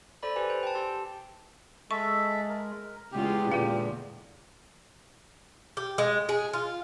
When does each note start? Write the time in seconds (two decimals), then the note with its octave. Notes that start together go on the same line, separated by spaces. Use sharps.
0.23 A4 C5 D5 B5
0.36 G4 B4 C5 G#5
0.50 C5
0.63 G5 A5
0.75 G4 C6 E6
1.91 G#3 A4 E5 C#6
2.49 A#4
3.12 E2 C#3 G#3 F4 G4
3.52 A#2 D3 G#3 F4 B4 F5
5.77 G4
5.98 G#3
6.29 G#4
6.53 F4